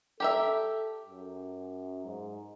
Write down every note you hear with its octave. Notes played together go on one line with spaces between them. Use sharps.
G4 A4 A#4 E5
F#2
G#2